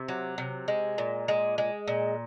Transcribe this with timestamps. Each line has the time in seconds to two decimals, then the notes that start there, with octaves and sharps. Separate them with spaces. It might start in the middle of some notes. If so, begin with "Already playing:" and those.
Already playing: C3
0.08 F#3
0.38 C3
0.68 G#3
0.98 A#2
1.28 G#3
1.58 G#3
1.88 A#2